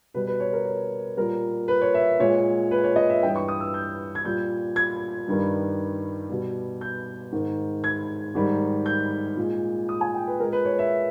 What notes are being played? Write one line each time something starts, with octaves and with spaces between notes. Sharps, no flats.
B2 G3 B4
B4
C#5
A#4
C#5
A#2 G3 A#4
B4
C#5
E5
A#2 G#3 C#5
B4
C#5
D#5
E5
G2 E3 G3 G5
C#6
D#6
E6
G6
G#6
A#2 G3 G6
G#6
G2 D#3 G3
B2 G3
G6
G#2 D#3 G#3
G#6
G#2 D#3 G3
G6
A#2 G#3
D#6
G#5
G5
B4
A#2 G#3 A#4
B4
C#5
E5